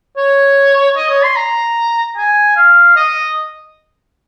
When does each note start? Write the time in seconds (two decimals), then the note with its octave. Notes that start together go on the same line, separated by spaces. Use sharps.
0.17 C#5
0.97 D#5
1.10 C#5
1.23 C6
1.36 A#5
2.17 G#5
2.56 F5
2.96 D#5